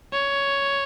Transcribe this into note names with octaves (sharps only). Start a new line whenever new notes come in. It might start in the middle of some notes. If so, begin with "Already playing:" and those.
C#5